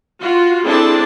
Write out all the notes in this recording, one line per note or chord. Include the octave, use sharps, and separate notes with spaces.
F4 F#4
C4 D4 E4 G#4 A4 A5